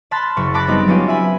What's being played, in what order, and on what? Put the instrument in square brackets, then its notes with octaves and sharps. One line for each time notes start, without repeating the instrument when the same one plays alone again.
[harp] A5 B5 C6 F6 F#6 A6
F#1 C#6
A5 B5 D6 F#6 A6 A#6
F#3 G3 B3 C4 D#4
F#3 G#3 B3 C#4 F4 G4
E5 G#5 B5